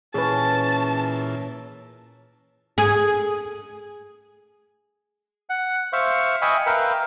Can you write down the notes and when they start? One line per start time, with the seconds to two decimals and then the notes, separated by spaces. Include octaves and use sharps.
0.14 A#2 E3 C#4 G#4 B4 A5
2.78 G#4
5.49 F#5
5.93 C5 E5 F5 C#6
6.42 D#5 E5 G5 G#5 B5 C#6
6.66 A#4 B4 E5 F5 G5